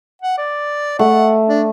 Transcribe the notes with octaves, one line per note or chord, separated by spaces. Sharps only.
F#5
D5
A3 F#5
D4